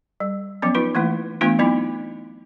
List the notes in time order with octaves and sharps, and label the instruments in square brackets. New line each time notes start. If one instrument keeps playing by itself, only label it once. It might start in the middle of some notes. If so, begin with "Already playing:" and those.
[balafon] G3
F3 F#3 B3 C#4
D#4 F4 B4
E3 A3 A#3 E4
E3 A3 B3 D4 F4
F#3 B3 C4 D#4 E4